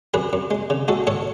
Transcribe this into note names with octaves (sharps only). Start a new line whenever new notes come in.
F#2 G#4 B4
F#2
G#3
C#3
G#3 F#4 A4
G#2 A4 C#5